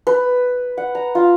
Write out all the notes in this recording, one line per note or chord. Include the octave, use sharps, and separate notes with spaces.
B4
F#5
A#5
F4